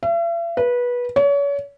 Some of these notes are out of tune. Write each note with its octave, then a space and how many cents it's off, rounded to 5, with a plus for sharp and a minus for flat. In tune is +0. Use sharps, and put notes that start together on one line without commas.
E5 +45
B4 -20
C#5 +35